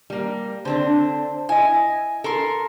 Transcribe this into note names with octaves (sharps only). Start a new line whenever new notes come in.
G3 A#3
D3 C4 D4 C5
E4 D#5 G#5
A4 A#4 C6